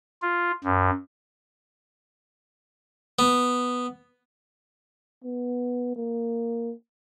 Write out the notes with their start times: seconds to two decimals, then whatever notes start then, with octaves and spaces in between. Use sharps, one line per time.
0.22 F4
0.64 F#2
3.19 B3
5.24 B3
5.96 A#3